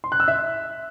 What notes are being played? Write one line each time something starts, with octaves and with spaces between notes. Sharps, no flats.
C6
F#6
E6
E5